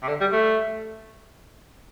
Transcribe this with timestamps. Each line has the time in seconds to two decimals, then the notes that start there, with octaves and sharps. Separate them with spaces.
0.03 C3
0.08 D3
0.21 G3
0.32 A3